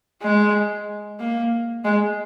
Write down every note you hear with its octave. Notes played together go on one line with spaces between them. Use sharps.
G#3
A#3
G#3